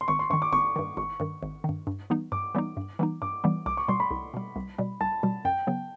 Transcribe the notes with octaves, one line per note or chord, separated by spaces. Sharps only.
C6
G#1 C#6
C6
G2 D#3 C#6
D6
G#1 C#6
G2 D#3
G#1 C#6
G2 D#3
G#1
G2 D#3
G2
E3 G3 B3 D#4
G2 D6
E3 G3 B3 D#4
G2
E3 G3 B3 D#4
G2 D6
E3 G3 B3 D#4
C2 D6
C#6
B2 G3 C6
B5
C2
B2 G3
C2
B2 G3
C2 A5
B2 G3
F#2 G5
C#3 F#3 B3